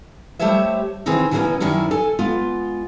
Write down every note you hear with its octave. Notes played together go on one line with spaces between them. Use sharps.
G3 A3 G4 C5 C#5 E5
C3 D#3 E3 C4 G#4
D3 E3 G3 A#3 B3 C#4
F#2 D#3 C#4 D4 E4
A4 G#5
G#3 B3 F4